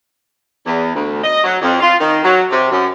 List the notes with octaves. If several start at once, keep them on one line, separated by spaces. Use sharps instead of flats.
E2
D2
D#5
F#3
F2
F4
D#3
F#3
C3
F#2